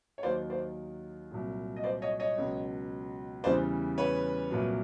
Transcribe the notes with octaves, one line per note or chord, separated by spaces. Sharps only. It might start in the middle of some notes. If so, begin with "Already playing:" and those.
C#5
D#2 D#3 F#3 C5 D5
C5 D5
C2 A#2 F#3
D#5
C5 D5
C#5 D#5
C#5 D#5
C#2 B2 F#3
E2 C#3 E3 G3 C5 D5
B4 C#5
C2 A#2 F#3